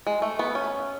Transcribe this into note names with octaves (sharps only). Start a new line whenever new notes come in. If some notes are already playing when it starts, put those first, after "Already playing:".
G#3
A3
B3
C#4